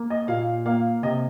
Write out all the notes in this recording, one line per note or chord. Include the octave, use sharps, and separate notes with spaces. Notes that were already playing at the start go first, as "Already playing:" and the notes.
Already playing: A#3
D#5
A#2 F5
A#3 F5
C3 D#5